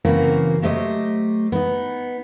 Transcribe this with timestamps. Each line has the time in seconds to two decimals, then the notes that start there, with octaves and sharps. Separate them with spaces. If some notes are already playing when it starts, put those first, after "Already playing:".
0.05 F#2 C#3 E3 A#3 C4 F#4
0.62 F#3 A3 G4 C5 D#5
1.52 B3 D#4